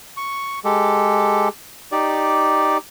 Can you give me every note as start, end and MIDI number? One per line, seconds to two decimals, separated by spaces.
0.17 0.59 85
0.65 1.49 56
0.65 1.49 67
0.65 1.49 69
1.92 2.78 63
1.92 2.78 67
1.92 2.78 74